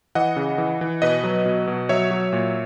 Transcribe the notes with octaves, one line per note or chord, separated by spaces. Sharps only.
E3 D#5 F#5
C#3
E3
E3
B2 B4 D#5
F#3
B2
B2
F#3 C#5 E5
F#3
A#2